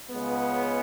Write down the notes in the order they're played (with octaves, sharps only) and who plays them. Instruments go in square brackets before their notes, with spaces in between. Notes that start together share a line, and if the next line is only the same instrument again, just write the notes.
[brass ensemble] C#2 C#3 G#3 B3